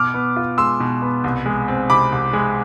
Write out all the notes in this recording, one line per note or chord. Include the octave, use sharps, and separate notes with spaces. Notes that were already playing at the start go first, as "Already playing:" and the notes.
Already playing: B2 D6 F6
B3
F4
G#3 C6 E6
B2
B3
C2
G#3
C4
C3 B5 D6
C2
G#3